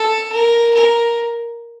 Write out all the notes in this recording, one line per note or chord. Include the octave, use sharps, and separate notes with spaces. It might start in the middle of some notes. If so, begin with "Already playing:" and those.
Already playing: A4
A#4
A#4